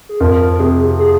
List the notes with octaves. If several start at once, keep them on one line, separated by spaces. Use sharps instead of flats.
G#4
F2 A#4
A#4
C3 G#4
G#4